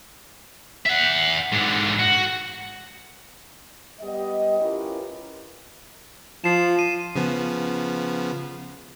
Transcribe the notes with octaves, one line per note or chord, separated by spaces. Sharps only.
E5 F#5
G#2 D3
F#4
G3 B3 G4 D#5
C#4 E4 F4 G4 A#4 B4
F3 C7 E7
D#7
C#3 F3 B3